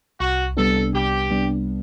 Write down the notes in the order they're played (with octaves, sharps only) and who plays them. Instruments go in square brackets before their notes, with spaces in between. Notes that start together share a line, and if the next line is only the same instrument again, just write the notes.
[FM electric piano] C2 [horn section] F#4
[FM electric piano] C3 G3 B3 D4 [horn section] A4
[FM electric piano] C2 [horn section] G4
[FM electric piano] C3 G3 B3 D4